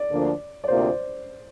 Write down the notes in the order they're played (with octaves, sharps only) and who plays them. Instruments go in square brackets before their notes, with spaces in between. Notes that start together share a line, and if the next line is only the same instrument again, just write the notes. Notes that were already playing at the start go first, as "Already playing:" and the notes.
Already playing: [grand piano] D5
[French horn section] D2 D3 F3 A#3 D4
[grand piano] D5
[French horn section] D2 C3 A#3 F4 [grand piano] C5